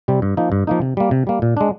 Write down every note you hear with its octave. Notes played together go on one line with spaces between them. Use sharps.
C3 G3 C4
G2
F3 A#3 D#4
G2
F3 A#3 D#4
C3
G3 A#3
C3
G3 A#3
A#2
G#3 D4